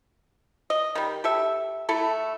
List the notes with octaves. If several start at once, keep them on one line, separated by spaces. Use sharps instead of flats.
D#5
D#3 G3
G4 A4 E5
A3 E4 A4